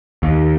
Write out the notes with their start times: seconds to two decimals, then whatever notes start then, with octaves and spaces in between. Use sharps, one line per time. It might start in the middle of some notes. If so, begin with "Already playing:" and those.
0.23 D#2